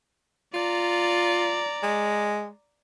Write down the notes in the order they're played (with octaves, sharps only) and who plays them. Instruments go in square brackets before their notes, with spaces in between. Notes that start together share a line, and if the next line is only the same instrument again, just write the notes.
[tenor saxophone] F4 [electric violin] D5 A#5
[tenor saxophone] G#3